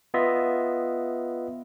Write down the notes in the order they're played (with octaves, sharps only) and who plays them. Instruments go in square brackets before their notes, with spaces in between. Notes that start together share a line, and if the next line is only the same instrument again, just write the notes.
[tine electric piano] B3 F4 D#5 E5